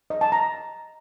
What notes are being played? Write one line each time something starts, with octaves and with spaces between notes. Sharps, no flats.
D#5
A5
A#5